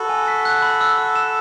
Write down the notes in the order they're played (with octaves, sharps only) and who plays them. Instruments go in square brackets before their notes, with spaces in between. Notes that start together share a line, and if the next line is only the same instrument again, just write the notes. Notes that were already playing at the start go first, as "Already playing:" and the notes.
Already playing: [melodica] F#4 A4 [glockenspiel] B5
[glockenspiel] G#5
B6
F#6
B5
E6
E6
E7